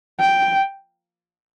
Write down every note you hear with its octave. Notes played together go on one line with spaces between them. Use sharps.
G5